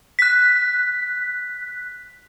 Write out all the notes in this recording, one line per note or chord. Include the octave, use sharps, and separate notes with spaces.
F#6 B6